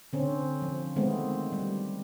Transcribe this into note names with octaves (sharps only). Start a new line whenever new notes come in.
D3 C4 C#4
F3
D#3 G#3 A3 B3 C4
G3